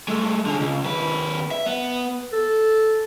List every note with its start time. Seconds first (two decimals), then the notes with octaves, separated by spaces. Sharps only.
0.08 G#3 A3
0.46 D3 G#4
0.60 C#2
0.84 D#2 B4
1.51 E5
1.66 B3
2.32 A4